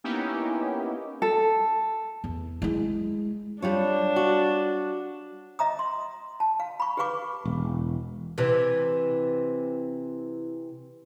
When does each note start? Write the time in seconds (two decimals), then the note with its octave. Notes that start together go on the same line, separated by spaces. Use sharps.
0.04 A#3 B3 C#4 D#4 E4 G4
1.22 A4
2.24 E2
2.62 G#3 E4
3.62 G3 D4 F4 C#5
4.16 F#4
5.59 D#5 E5 A#5 D#6
5.79 C6
6.40 A5
6.60 F5
6.80 B5 C#6
6.97 G4 G#4 B4 F5 C#6 D6
7.45 E1
8.38 C3 E3